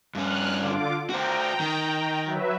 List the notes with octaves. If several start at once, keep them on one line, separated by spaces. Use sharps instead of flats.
G2 C#4 F6 F#6
D3 F4 D6
F#4 C5 G5 A#5
D#3
F#3 B4 E5